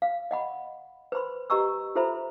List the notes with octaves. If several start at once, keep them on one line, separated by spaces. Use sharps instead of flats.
F5
D#5 F#5 B5
B4 C5 B5 C6
G4 B4 D#5 A#5 C#6 E6
F4 A4 C5 E5 A#5 B5